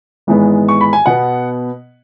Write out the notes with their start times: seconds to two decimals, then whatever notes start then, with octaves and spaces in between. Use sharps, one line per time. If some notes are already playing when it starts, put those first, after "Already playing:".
0.27 G#1 G#2 E3 G#3 B3
0.69 C#6
0.81 B5
0.93 G#5
1.06 B2 B3 F#5